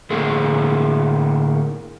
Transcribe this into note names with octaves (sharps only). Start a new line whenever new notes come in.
A2 D3 A#3 G#4 A4